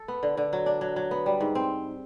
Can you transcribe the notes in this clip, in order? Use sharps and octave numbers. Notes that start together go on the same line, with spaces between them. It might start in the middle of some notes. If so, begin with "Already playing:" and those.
Already playing: A4
B3
D3
D3
F#3
D4
F#3
F#3
B3
G3
G#2
C4